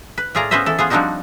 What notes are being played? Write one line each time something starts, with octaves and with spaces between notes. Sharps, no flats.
B4
A2 F4 G#4 D5 A#5
B3 C#4 B4 C5 D#5 E5
E3 A4
B3 F4 G#4
F3 G3 C4 D4 D#4 F#4